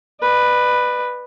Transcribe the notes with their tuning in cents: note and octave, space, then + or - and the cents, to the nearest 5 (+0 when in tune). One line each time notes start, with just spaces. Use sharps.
B4 +0 D5 +40